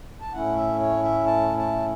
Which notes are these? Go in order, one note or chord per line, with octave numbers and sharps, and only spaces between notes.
A5
A2 A3 C#4 E4 F#5
E5
C#5
E5
A5
A5